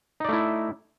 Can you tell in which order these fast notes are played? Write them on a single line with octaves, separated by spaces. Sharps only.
D#4 D5 A3 E4